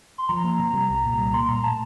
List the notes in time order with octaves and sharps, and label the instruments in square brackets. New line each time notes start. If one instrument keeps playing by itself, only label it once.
[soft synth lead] C6
[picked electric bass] F3 [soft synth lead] A#5
[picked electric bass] A#3
C3
G3
C2
A#2
[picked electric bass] G3 [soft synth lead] A#5
[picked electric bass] A#3 [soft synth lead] C6
[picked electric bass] A#2 [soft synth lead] A#5
[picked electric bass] A3 [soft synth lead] A5